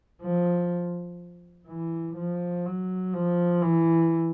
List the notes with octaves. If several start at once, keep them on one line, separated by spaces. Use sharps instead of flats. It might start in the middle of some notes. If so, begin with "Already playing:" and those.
F3
E3
F3
F#3
F3
E3